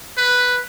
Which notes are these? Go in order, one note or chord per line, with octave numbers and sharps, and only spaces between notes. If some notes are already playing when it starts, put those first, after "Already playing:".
B4